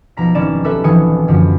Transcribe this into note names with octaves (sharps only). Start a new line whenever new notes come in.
B1 F3 A#5 B6
G#1 C#4 E4 D5 E7
G4 A4 B4 E5
G#1 E3 F3 G#5 D#6 C#7
F#2 D3 F3